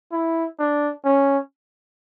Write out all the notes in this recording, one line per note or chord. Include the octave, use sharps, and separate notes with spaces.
E4
D4
C#4